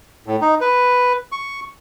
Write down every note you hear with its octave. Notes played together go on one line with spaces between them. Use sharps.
A2
D#4
B4
C#6